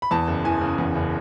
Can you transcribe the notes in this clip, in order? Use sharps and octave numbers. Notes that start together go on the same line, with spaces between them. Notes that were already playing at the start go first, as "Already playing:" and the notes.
B5
E2 A5
F#1
E3 G#5
C#3
E2
F#1